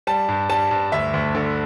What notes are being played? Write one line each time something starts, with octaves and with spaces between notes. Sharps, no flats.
G3 A5
G2
G3 A5
G2
D2 E5
D2
D3